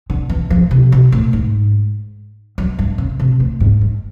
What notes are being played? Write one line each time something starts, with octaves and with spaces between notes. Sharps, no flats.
D3
E3
F3
C3
B2
A2
G#2
F#2
G2
C#3
C3
A2
G#2
G2